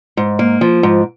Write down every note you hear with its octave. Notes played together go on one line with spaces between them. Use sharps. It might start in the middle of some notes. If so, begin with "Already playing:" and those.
G#2
A#3
F3
G#2